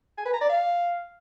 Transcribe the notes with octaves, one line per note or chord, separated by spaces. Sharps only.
G#5
B4
A#5
D5
F5